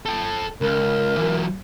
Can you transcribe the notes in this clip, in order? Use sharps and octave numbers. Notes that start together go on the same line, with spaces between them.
A4 G5
C#2 A#4
E3 F#3